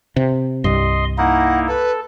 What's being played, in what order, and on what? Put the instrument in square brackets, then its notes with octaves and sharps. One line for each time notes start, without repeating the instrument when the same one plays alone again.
[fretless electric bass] C3
[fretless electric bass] C2 G2 [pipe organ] D#5 C6
[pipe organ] A#3 D#4 E4 [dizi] F#5
[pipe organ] A4 [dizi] B4